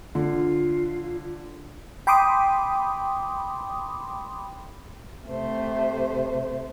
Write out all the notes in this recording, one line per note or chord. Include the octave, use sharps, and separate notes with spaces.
D3 F4
G5 B5 C6 D6 D#6
C3 A3 C5